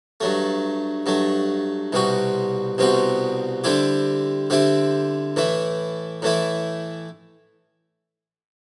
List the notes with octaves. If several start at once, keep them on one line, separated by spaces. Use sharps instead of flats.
G2 F#3 A3
G2 F#3 A3
C2 B2 G3 C4 F#4
C2 B2 G3 C4 F#4
D3 G3 C4 E4 G4
D3 G3 C4 E4 G4
A2 E3 A3 E4
A2 E3 A3 E4